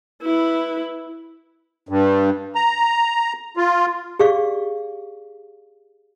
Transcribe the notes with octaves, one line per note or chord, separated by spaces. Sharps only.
E4 B4
G2
A#5
F4
G4 G#4 D5 F5 C#6